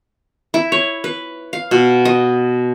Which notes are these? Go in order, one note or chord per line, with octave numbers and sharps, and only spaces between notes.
E4
C#5
B4
F5
B2
D#5